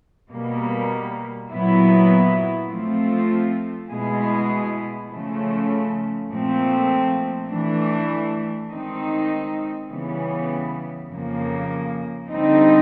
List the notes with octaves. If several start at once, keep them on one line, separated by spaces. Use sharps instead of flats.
B2 G3 A#3
A#2 F#3 B3 E4
F3 A3 C4 F4
B2 G#3 B3 E4 G#4
C#3 F3 A3
A#2 F3 A3 C4
E3 A3 D4
D#3 G#3 C4 D#4
C#3 E3 G3 B3
F2 C#3 F3 A#3
D3 G3 C4 D#4